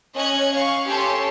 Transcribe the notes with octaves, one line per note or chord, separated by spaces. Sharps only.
C#4 D#5 F#6 G#6
F5 C#6
C#4 G4 A4 C#5 A5 C6